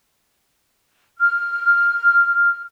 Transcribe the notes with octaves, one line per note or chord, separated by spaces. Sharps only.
F6